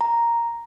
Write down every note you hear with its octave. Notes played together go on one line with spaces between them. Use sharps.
A#5